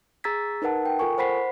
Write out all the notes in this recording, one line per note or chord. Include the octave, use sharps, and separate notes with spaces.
G#4 A#5 E6 G#6 A6 B6
D#4 A#4 B4 F#5 A5
G5
F4 A4 A#4 G#5 C#6
C5 F#5 B5 B6 C7